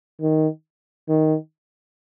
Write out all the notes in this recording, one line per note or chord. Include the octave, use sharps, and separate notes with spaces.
D#3
D#3